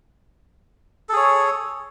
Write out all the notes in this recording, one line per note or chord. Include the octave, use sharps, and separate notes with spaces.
G#4 A4 C#5